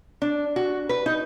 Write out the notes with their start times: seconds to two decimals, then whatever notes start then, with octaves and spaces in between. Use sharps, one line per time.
0.22 D4
0.56 F#4
0.89 B4
1.06 D#4